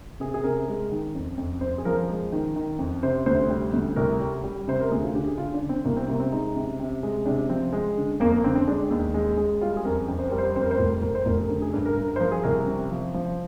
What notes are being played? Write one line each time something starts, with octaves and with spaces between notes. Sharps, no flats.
C3 G#4
G#4
C3 A#4
G#3
D#3
F2
F2
F2 C5
G#4
F3 A#4
G#3
D#3
D#3
F2
C3 C5
D2 C5
G3
D2
C2 A#4
G3
G3
C3 C5
A#4
D2 G#4
F4
D3 G4
G#4
D3 F4
D4
D3
C4
C2 A#3
C4
C3 A#3
C4
G#3 D#4
C3
C3
G#3
C3 D4
F3 C4
G#3
D3
F2 A#3
A#3
D3 C4
C4
G#3 D4
D#2
G#3
G#3
G3 F4
G#4
F2 A#4
F2
C5
G3 A#4
C5
F2 C5
A#4
C5
F1 A#4
F1 A#4
C5
F1 A#4
A#4
D3 A#4
G#4
G2
A#4
G2 A#4
A#4
C5
F3 A#4
G#4
C2 A#4
C3
F3
F3